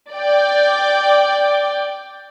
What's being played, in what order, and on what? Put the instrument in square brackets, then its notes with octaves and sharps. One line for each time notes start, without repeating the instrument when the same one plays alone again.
[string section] D5 G5